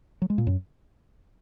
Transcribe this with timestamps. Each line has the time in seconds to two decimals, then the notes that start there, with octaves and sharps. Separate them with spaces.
0.22 F#3
0.30 G#3
0.38 A#2
0.47 F#2